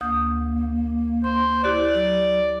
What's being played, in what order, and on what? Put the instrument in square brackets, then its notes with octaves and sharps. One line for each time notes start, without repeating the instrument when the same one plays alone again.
[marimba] D2 D#6 G6 [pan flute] A#3
[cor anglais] C5 [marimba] C6
[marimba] E4 G4 F#6 [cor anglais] D5
[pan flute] F#3